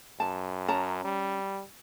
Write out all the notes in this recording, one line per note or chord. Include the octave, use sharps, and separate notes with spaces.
F#2 A5
C#4 A5 A#5
G3